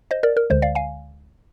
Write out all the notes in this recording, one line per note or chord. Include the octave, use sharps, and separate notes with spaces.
C5 D#5
A#4 D5
A#4
D2 D3 G#3 C5
D5 F5
F5 G#5